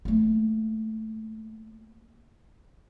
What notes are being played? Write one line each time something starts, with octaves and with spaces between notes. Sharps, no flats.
A3 A#3